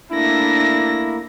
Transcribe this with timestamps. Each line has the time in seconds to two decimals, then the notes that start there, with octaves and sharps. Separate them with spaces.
0.12 A3 A#3 D4 E4 A#6